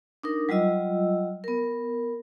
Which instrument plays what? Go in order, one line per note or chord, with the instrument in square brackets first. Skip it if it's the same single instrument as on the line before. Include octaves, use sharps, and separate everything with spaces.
[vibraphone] D4 D#4 A#4
F#3 G3 F4 D#5 E6
B3 A#4